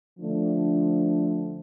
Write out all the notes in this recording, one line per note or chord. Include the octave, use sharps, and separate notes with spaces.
D3 F3 A3 D4